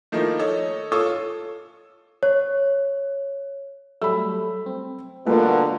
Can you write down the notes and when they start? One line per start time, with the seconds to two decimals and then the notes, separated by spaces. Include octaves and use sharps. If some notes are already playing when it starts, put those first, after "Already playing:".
0.12 D#3 F3 A3 A#3 D#4 E4
0.39 A4 C#5 D#5
0.92 F4 A4 C#5 C#6 D#6 E6
2.23 C#5
4.02 F#3 G3 A3 B5 E6
4.66 C4
5.26 B2 D3 F3 G3 A3 A#3 B4